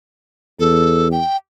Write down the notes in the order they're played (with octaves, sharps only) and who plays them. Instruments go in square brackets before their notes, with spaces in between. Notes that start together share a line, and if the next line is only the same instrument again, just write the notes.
[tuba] E2 [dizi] A4
[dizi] G5